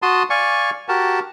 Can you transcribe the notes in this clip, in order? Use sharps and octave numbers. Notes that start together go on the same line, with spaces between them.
F#4 A5 C6 D#6
D5 F5 G#5 C#6
F#4 G4 A#4 A5